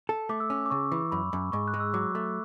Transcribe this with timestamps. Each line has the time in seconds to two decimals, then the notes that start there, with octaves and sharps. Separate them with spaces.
0.09 A4
0.29 A3 D6
0.40 E6
0.50 C#4 D6
0.66 D6
0.70 C#3 C#6
0.92 E3
1.12 F#2 B5
1.33 F#2
1.52 G#2 C#6
1.68 F#6
1.74 G#3
1.80 E6
1.94 F#3 D6
2.15 A3